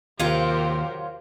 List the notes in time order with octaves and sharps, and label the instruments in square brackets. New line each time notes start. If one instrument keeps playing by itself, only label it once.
[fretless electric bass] D#2 C3 [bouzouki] F#3 F4 [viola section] G4 A#4 C5 [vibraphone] F5